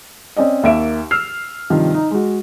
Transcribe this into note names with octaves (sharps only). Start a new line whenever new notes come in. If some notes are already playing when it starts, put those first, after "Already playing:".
C4 C#4 D5 D#5
D#2 A#3 E5 D7
E6 F6 C7
G2 C3 D#3 F3
D#4
G#3 F#4